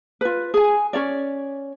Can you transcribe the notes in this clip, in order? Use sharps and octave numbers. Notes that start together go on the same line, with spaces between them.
F4 B4
G#4 G#5
C#4 F4 C#5 D5